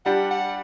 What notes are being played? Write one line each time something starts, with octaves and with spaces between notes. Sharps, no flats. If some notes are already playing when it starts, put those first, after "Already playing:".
G3 D4 G4 F#5
F#5